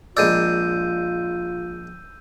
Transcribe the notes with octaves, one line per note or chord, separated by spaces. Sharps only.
A#1 G#3 F4 D5 E6 G6 D#7